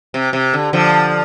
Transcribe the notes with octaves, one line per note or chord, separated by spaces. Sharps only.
C3
C3
D3
D3 F3